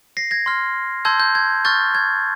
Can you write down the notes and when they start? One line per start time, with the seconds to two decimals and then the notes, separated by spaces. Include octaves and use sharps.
0.17 A#6 C7
0.31 G#6 A#6
0.46 C6 F6
1.05 A5 C6 E6 G6 G#6
1.20 G6
1.35 G#6
1.65 C#6 F6 G6 A6
1.95 G#6